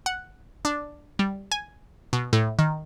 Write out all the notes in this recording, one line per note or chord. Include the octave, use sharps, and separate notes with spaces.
F#5
D4
G3
G#5
B2
A2
D#3